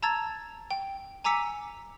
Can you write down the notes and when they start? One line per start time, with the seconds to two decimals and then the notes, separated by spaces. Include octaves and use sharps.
0.03 A5 A#5 E6 G#6 A6
0.71 G5
1.24 G#5 A#5 D6 E6 B6 C#7